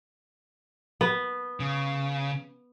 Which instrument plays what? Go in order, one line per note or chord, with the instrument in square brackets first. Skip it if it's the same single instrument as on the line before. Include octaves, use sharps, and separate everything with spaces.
[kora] B3
[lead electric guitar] C#3